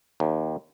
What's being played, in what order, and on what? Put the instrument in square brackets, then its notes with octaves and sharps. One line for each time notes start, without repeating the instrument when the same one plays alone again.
[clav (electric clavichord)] D#2